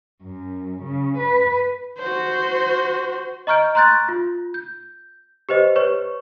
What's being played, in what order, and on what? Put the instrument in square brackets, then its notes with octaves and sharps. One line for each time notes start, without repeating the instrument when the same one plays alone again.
[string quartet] F#2
C#3
B4
[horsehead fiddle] F#4 C5
[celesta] D#5 A#5 C#6 F6 G6 D7
A#5 C6 F#6 G6 A6
F4
G6
G4 B4 C5 D#5
B4 C#5 C#6